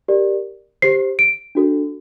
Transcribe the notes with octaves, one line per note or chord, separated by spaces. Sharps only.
G4 A#4 D5
G4 C5 C7
D7
D4 F#4 A4